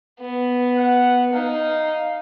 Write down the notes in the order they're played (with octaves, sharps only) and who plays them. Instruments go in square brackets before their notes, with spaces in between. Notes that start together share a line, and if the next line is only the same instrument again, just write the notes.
[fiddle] B3
[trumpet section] F#5
[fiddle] D#4 [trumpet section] F5